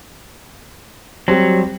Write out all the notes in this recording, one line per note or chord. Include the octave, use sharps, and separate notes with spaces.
F#3 G3 C4